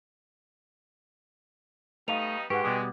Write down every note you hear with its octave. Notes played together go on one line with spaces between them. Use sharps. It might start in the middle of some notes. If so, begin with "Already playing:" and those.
G3 A3 B3 D#4 F5 D#7 F7
G#2 G#3 G4 B4 F#5 C#6
B2 G3 G#3 B3